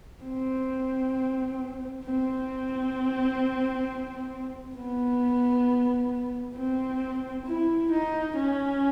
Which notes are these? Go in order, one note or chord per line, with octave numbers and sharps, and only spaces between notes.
C4
C4
B3
C4
E4
D#4
C#4